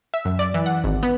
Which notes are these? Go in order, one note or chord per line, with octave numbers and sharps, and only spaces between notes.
E5
F#2
D5
E3
F#5
G#1
B3